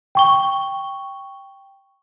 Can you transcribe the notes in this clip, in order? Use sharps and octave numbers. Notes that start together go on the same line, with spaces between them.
G5 C#6 G7